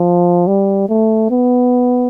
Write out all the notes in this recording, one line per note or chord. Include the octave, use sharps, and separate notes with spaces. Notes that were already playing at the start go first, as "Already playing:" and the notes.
Already playing: F3
G3
A3
B3